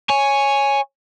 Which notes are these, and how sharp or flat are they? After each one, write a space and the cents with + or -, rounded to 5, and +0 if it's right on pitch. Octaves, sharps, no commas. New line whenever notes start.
C#5 +0 G#5 +0